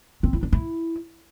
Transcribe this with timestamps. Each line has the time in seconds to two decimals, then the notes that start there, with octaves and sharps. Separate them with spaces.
0.23 C4
0.33 E4
0.43 D4
0.53 E4